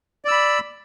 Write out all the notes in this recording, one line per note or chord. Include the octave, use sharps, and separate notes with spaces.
D5 B5 E6